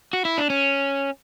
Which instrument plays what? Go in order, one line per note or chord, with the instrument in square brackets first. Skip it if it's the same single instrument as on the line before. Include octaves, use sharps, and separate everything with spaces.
[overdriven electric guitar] F#4
E4
D4
C#4